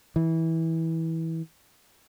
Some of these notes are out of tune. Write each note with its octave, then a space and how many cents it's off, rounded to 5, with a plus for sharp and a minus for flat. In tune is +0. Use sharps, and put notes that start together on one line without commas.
E3 -20